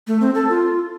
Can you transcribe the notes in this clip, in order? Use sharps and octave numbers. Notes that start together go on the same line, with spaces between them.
A3
C4
A4
F4